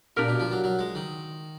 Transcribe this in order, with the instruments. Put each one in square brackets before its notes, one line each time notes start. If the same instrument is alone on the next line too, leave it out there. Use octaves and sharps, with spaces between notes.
[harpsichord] A#2 [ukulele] D4 G4 A#4
[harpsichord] B2
F3
F#3
F#3
G#3
D#3